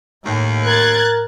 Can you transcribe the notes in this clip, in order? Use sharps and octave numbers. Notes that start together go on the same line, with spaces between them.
D#2 A2
A#4 F#6 G#6 A6